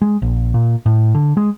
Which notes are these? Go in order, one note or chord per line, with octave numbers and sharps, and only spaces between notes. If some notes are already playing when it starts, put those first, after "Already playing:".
G#3
A#1
A#2
A2
D3
G#3